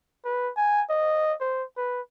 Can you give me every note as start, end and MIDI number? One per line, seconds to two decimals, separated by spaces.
0.25 0.51 71
0.57 0.83 80
0.90 1.34 75
1.41 1.63 72
1.77 2.01 71